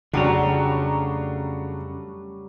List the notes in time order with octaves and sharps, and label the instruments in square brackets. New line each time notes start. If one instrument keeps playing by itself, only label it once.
[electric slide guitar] F2 A3 A#5 [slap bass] C#3 [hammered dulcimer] F#3 G3 [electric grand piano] D4 F#4